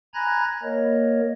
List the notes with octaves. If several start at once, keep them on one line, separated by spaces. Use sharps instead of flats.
G#5 A#5 B5 F#6 G#6 A#6
A#3 A#4 C#5 D#5